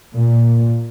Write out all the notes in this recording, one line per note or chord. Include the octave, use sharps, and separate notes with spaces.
A#2